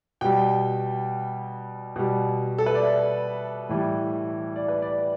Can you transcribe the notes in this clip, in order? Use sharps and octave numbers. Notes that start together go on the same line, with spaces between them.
B2 G3 G5
B2 G3
A4
B4
D5
E5
A2 E3 G3
D5
B4
D5